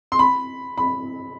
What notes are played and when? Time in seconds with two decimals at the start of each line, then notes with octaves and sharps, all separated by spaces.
0.12 C6
0.19 B5
0.78 B5